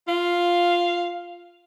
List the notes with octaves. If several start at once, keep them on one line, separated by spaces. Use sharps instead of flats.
F4 F5